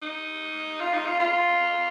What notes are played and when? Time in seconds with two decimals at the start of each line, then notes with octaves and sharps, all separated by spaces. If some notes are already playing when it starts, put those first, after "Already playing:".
0.02 D#4
0.80 F4
0.94 D#4
1.06 F4
1.20 F4